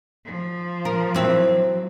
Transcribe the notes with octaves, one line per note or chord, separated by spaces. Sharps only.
F3
A#4
F#3 C4 E4